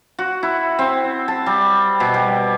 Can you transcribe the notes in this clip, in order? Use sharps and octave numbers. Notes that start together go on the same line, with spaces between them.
F#4
E4
C4
A5
G3
B2
G3